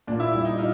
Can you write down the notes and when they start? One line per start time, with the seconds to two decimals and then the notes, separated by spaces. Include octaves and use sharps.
0.07 A#2 D4
0.20 E4
0.33 G3 E4
0.45 D#4
0.58 D#4 F4